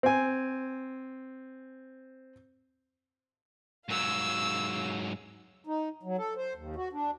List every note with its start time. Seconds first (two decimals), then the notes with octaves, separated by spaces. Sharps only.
0.03 C4 G#5
3.89 G#2 F#3 F5 E6
5.67 D#4
6.03 F#3
6.18 A4
6.36 C5
6.55 D#2
6.76 F#4
6.93 D4